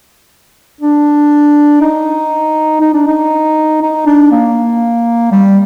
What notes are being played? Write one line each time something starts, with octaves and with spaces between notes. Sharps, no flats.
D4
D#4
D#4
D4
D#4
D#4
D4
A#3
G3